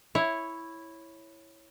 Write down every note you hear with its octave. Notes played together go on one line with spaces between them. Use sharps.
E4 C#5